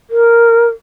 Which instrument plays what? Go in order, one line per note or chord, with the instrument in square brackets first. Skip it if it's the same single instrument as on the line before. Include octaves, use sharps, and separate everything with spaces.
[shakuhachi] A#4